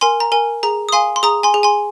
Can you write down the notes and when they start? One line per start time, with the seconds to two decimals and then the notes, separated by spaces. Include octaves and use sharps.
0.01 A#4 G#5 C6
0.20 A#5
0.32 A#4 G#5
0.63 G#4 A#5
0.89 D#6
0.92 F5 G#5 C6
1.16 C6
1.23 G#4 A#5 D#6
1.43 G#5 C6
1.54 G#4
1.63 G#5 C6